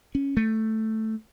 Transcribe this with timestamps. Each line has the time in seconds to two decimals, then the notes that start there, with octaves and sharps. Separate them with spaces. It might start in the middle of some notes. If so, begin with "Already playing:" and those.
0.15 C#4
0.37 A3